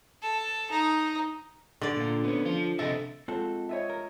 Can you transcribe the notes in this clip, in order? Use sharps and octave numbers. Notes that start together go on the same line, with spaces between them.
A4
D#4
D3 D5
A#2 F4
B3 C#4
F3 F4
C3 A4 D#5 E5
G#3 C4 F4 F#4 A4
C#5 D#5 E5
A#4